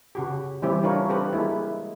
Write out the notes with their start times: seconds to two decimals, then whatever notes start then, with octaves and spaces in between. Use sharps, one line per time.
0.15 C#3 F#4 G4
0.62 E3 G3 C4 E4 G4
0.84 D4 F4 A#4 C#5
1.09 C4 G4 A4 B4
1.33 G#3 A#3 D#4 E4